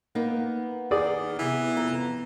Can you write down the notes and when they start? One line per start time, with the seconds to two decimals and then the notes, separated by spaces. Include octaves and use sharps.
0.15 A#3 B3 D#4
0.91 D#3 G#4 D5 D#6
1.39 C3 E3 B3
1.77 F2 A#5